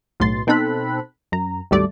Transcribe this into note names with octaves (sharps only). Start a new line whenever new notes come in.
B1 A2 C6 A6
B2 C4 D#4 A4 B5 F#6
F#2 A#5
G#1 D2 G3 A3 D5